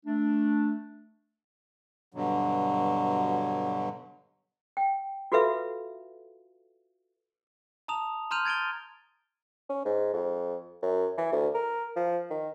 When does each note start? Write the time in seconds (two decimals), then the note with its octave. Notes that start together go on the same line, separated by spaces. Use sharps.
0.06 A3 D4
2.14 G2 B2 D3 F#3
4.77 G5
5.32 F4 F#4 A4 B4 E5 F5
7.88 A5 A#5 D#6 F7
8.31 A#5 C6 F6 G6 D#7 F7
8.45 G#6 A6 D7 D#7 G7
9.69 C#4
9.85 G#2
10.13 F2
10.82 F#2
11.18 E3
11.32 D2
11.54 A#4
11.96 F3
12.30 D#3